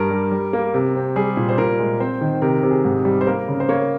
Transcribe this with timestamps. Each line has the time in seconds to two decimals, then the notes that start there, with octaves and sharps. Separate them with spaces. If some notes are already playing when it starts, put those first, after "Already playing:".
Already playing: G2 A#4
0.10 G3
0.31 G3
0.53 A#3
0.74 C3
0.95 C4
1.16 G3 G#4
1.37 A#2
1.49 C5
1.58 A#2 A#4
1.79 G#3
2.00 C4 C5
2.21 D#3
2.42 C3 A#4
2.63 C3
2.70 G#4
2.85 G#2
3.05 G3
3.21 C5
3.27 A#3 A#4
3.48 C#3
3.60 C5
3.69 A#3 C#5